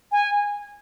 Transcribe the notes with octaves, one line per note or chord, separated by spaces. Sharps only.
G#5